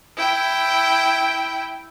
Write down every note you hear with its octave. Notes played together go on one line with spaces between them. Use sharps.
E4 G5